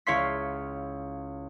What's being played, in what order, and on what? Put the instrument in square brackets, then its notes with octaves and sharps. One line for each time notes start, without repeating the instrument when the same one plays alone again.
[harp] C#2 E4 C#5 F5 C6 B6